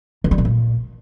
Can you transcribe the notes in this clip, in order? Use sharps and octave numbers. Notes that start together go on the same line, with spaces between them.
D3
G3
B2
A#2